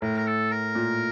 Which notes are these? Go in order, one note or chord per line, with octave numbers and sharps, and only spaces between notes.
A2 A#4
A#4
A4
A#4
A#2